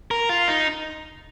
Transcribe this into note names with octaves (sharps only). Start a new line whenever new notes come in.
A#4
F4
D#4